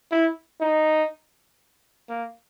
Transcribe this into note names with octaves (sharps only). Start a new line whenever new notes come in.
E4
D#4
A#3